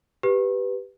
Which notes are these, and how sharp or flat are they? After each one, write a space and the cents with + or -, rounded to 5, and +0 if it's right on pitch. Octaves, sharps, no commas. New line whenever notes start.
G4 +0 B4 +0